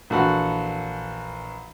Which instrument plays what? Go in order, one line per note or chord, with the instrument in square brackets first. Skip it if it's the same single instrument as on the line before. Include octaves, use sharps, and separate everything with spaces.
[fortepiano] A#1 E3 F#4 A4 F#5